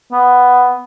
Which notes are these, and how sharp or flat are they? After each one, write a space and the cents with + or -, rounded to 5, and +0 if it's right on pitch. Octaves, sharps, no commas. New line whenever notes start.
B3 +5